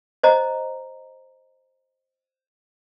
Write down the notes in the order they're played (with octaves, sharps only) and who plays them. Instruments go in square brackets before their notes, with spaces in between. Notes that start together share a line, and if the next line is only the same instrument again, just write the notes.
[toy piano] C5 D#5 A#5